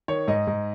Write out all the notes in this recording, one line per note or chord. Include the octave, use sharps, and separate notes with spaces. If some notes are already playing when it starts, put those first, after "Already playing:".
D#3 C#5
G#2 D#5
G#2